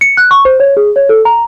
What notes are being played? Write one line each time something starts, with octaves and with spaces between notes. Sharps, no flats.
C#7
F#6
C#6
C5
C#5
G#4
C#5
A4
A#5